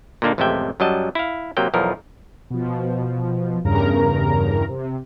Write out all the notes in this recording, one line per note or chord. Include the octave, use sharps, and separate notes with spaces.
A#2 D3 A#3 D4 D#4
A1 F2 C3 G#3 E5 G5
F#2 F#3 G3 D#5 A5
E4 F5
C3 F#3 A#3 G5
B1 E2 F3 A#4
B2 F3
E2 G2 C#3 A#4 A#5
C3